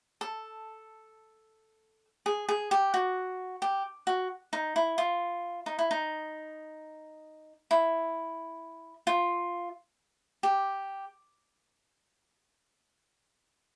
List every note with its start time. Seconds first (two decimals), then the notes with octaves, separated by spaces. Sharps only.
0.21 A4
2.26 G#4
2.49 G#4
2.71 G4
2.94 F#4
3.62 G4
4.07 F#4
4.53 D#4
4.76 E4
4.98 F4
5.66 D#4
5.79 E4
5.91 D#4
7.71 E4
9.07 F4
10.43 G4